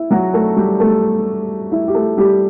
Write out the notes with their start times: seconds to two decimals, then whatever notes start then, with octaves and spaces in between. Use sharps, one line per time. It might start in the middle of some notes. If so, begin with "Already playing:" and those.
Already playing: E4
0.11 F#3 F#4
0.33 A3 A4
0.57 G3 G4
0.80 A3 A4
1.72 E4
1.88 G4
1.95 A3 A4
2.17 G3 G4